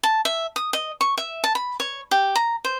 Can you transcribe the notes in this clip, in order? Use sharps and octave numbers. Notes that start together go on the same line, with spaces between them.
A5
E5
D#6
D#5
C#6
E5
A5
B5
C#5
G4
A#5
C5